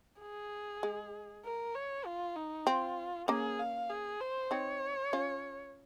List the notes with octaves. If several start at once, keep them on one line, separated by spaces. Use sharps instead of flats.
G#4
G#3
A#4
C#5
F4
D#4
C4 F4
A#3 C#4 G#4
F5
G#4
C5
C4 D#4 C#5
C#4 F4